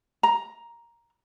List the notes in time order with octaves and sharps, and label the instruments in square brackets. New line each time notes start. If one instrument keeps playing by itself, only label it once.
[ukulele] A#5